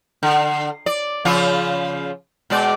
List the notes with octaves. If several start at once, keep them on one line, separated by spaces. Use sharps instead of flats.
D3
D5
C#3 F3 F4
B2 G#3 D5